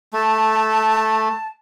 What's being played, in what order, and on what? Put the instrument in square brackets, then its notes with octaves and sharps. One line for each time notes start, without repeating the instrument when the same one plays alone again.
[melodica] A3 [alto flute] A5